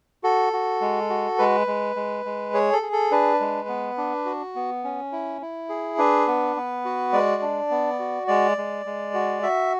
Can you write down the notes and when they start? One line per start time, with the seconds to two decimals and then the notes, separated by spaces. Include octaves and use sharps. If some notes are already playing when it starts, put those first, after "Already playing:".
0.23 F#4 A4
0.53 F#4
0.81 G#3
1.10 F#4
1.38 G#3 B4
1.67 G#3
1.96 G#3
2.25 G#3
2.54 G#4 C#5
2.73 A4
2.82 G#4
2.92 A4
3.11 D4 B4
3.40 G#3
3.68 B3
3.98 D4
4.26 F#4
4.55 B3
4.84 C#4
5.12 E4
5.42 E4
5.69 G#4
5.98 D4 B4
6.27 B3
6.56 B3
6.85 F#4
7.13 G#3 D5
7.42 D4
7.71 B3
7.99 F#4
8.28 G#3 D5
8.57 G#3
8.86 G#3
9.14 F#4
9.43 F#4 E5